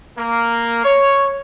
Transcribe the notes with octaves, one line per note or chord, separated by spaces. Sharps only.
A#3
C#5